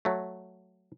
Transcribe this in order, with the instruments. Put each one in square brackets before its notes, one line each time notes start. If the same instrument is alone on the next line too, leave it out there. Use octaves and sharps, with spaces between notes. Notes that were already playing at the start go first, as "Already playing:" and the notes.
[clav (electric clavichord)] F#3 A3